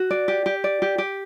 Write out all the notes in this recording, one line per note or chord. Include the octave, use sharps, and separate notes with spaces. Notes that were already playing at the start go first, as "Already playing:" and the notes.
Already playing: F#4
D5
G4
G4
D5
G4
G4